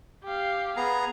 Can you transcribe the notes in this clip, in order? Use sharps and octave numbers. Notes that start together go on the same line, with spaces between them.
G4 F5
B3 G#4 A#5